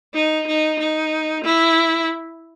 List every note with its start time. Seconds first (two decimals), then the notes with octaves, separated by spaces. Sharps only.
0.14 D#4
0.47 D#4
0.79 D#4
1.44 E4